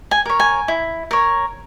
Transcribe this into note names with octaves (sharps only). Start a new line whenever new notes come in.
G#5
A#4 C#5
G#5
E4
A#4 C#5